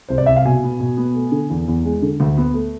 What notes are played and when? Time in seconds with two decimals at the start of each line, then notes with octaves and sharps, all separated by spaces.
0.09 C2 C5
0.18 D5
0.26 C2 E5
0.36 F5
0.45 B2 G#5
0.63 B3
0.80 B2
0.97 B3
1.14 A3
1.32 D3
1.50 E2
1.68 E2
1.85 G#3
2.02 D3
2.20 D2
2.37 B3
2.54 A3